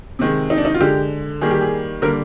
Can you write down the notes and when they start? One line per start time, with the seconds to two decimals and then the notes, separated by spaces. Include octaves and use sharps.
0.19 C3 D#3 G#3
0.50 D#4
0.57 D4
0.65 D#4
0.74 F4
0.80 D3 G#3 G4
1.41 D#3 G3 A#3 G#4
1.51 G4
1.61 G#4
2.02 D3 G3 A#3 A#4